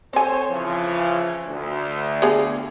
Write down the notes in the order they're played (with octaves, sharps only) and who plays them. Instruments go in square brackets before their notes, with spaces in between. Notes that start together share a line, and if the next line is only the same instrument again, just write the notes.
[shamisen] C4 G#5 [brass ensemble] A4 C5 C#5
[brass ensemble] C#3 E3 F3
D2
[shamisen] B3 G#4 F5